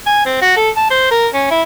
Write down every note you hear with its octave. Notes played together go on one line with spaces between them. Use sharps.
G#5
C4
F#4
A4
A5
C5
A#4
C#4
E4